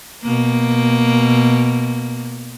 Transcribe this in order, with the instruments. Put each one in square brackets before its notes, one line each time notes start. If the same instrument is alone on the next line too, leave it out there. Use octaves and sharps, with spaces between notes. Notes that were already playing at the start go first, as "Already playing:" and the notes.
[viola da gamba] B2 A#3